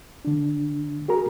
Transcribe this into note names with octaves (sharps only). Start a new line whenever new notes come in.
D3 D4
F#4 G#4 A#4 A#5